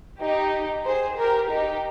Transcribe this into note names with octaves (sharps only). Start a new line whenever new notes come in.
D#4 G4
G#4 C5
G4 A#4
D#4 G4